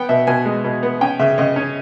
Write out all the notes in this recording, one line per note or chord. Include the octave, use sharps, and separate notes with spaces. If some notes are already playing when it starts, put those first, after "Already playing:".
Already playing: B3 G5
B2 E5
B2 G#5
G#3
B2
B3
C#4 G5
C#3 E5
C#3 D#5
C#4